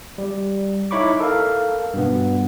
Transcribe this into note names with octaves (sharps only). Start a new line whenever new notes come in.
G3
D#4 E4 C#5 B5 C#6 D6
A4 A#4 F5
G2 B2 B3